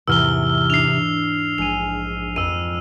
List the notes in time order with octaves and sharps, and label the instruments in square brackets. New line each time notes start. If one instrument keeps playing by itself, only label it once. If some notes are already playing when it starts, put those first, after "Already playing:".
[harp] E2 G#2 [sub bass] C3 [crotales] E6 F6 G7
[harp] D4 D#4 [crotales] C7 F7
[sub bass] A#1 [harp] G#3 G#4 [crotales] D#7 F7
[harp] F2 [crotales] E6 D#7